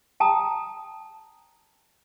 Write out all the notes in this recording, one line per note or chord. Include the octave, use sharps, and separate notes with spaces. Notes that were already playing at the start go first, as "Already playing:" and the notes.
G5 A5 A#5 D#6